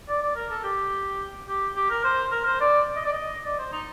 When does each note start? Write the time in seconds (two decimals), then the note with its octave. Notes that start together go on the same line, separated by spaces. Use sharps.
0.08 D5
0.23 D5
0.36 A#4
0.51 A4
0.64 G4
1.48 G4
1.76 G4
1.90 A#4
2.04 C5
2.32 A#4
2.46 C5
2.61 D5
2.96 D#5
3.05 D5
3.12 D#5
3.45 D5
3.59 C5
3.73 D#4